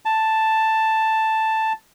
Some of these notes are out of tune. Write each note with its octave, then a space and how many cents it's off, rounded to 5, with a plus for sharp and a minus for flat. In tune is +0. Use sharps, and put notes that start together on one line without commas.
A5 +5